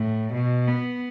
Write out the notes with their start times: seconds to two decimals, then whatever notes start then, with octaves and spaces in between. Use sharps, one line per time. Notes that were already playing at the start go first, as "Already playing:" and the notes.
Already playing: A2
0.33 B2
0.68 B3